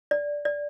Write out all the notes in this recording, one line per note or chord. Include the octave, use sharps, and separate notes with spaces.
D5
D5